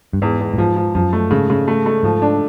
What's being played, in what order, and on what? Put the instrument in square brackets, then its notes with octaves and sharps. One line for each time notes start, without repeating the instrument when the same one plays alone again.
[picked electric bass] G2
[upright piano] E2 [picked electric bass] G#2
[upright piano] E2
[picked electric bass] A2
[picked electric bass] G#2 [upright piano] F3
[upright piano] F3
[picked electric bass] F#2 [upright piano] F3
[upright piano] A3
[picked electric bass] G#2 [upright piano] C#3
[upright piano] C#3
A3
A3
[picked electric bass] G#2 [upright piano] F3
[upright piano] D4